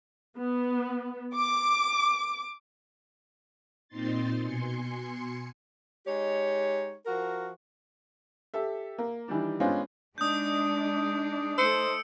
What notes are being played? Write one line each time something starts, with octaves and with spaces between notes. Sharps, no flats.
B3
D6
A#2 C4 D#4 C6 A6
B2 G#5 C6 C#7
G#3 D#4 G4 C#5
F3 F#4 A#4
G4 A4 E5
A#3
D#3 E3 G3 D4
G#3 B3 C#4 D4 F4 C5
G#3 D4 D#4 D#6 G6
A3 D#4 A4 C5 E6 C#7 D7